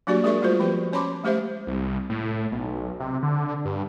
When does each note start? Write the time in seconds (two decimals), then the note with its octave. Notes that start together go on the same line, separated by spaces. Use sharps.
0.07 F#3 A#3 D4 F#4 G4 D5
0.24 G#3 G#4 A#4 D5 E5 C#6
0.42 G3 A3 F4 F#4 C5
0.60 F3 B3 G4 B4
0.93 C#4 C#5 A5 B5 C6 D6
1.24 G#3 A3 G4 C5 E5
1.67 C2
2.10 A2
2.52 B1
3.00 C3
3.23 D3
3.65 G2